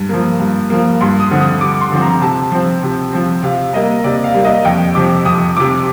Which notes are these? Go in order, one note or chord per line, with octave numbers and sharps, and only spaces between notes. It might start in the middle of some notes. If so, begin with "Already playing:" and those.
Already playing: G2
F3 A#3
G2
F3 A#3
G2 C6
D#6
D3 F3 C4
D#6
G2 D6
C6
D3 F3 C4
A#5
C3 A5
F3 C4
C3
F3 C4
C3 F5
G3 A#3 D#5
C3 D5
F5
G3 A#3
D#5
F2 G5
C3 F3 D6
F2 D#6
C3 F3 D6